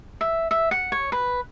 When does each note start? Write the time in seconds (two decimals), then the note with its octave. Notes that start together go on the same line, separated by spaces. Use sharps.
0.21 E5
0.51 E5
0.71 F#5
0.92 C#5
1.12 B4